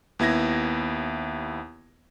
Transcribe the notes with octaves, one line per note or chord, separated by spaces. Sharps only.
D#2 B3 E4 G#6 A#6